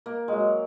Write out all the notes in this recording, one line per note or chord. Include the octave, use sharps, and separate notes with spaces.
A#3
F#3 G#3